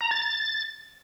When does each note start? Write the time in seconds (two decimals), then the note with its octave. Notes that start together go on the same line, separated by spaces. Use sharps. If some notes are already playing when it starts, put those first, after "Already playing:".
0.01 A#5
0.11 A6
0.22 A6